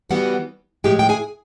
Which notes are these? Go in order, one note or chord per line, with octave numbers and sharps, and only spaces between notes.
C#3 E3 G3 B3 F#4 F#5
A2 F3 G#3 G4 G5
G5
G#4 G#5